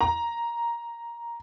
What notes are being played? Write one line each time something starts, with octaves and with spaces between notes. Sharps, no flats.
A#5